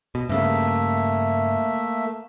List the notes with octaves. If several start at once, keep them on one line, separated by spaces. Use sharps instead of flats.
B2
G2 C#3 A3 A#3 E5